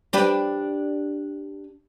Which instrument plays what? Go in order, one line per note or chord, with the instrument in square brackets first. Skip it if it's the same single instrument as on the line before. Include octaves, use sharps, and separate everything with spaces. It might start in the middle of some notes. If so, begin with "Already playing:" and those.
[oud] D4 G4 B4